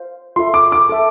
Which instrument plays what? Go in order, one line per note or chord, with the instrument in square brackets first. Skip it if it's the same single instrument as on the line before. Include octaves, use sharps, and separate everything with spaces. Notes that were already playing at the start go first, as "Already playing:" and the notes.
Already playing: [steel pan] C5 F5
[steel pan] F4 A4 E5 [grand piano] C6
[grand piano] D6
D6
[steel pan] A4 E5 A5